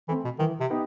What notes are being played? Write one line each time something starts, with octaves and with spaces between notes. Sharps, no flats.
E3 A3 C4
B2
D#3 E3
C3
B3 D#4 G4